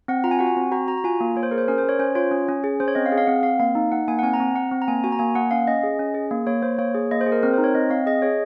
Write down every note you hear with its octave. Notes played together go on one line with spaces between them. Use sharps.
C4 F#5
F4 A#5
G#5
F#4 F#5
G#5
C4
F#4 A#5
F#4 A#5
A#5
F4 G#5
A#3
A#3 C#5
C5
G#4 A#4
C5
C#4 A#4
C5
C#4 C#5
C#4 C5
F4 C#5
C#4
C#4
G#4
C#4 C5
C#5
C4 D#5
F5
G#4
F5
C4 F#5
C4 F5
A#3 F5
D#4
D#4 F#5
A#3 G#5
F#5
C4 G#5
A#5
C4
C4 F#5
C4
A#5
A#3 G#5
F#4 G#5
A#5
A#3 G#5
A#3 F#5
C#4 F5
C#4 D#5
G#4
C#4
G#4
A#3
A#3 C#5
A#3 C5
A#3 C#5
G#4
A#3 D#5
C5
G#4
A#4
C4 A#4
C5
D#4
C#5
C4 D#5
C4 F5
G#4 D#5
G#4 C#5